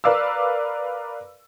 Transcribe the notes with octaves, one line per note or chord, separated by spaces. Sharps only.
A#4 B4 D5 F5 D6 E6